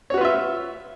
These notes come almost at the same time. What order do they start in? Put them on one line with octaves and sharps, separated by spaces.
C#5 F#4 B4 F4 E5